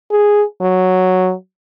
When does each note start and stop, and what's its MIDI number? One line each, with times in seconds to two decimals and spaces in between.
0.11 0.43 68
0.61 1.33 54